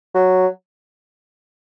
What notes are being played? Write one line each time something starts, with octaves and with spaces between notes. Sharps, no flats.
F#3